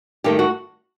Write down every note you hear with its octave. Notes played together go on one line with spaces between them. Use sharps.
G2 D#3 A3 G4
F#4